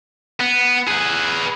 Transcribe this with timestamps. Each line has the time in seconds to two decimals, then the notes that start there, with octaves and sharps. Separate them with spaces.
0.40 B3
0.88 G#4 B4